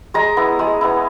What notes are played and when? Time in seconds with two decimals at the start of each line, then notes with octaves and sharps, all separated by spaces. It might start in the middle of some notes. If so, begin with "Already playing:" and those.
0.14 G#3 A#5
0.37 B3 E4
0.59 G#3
0.81 B3 E4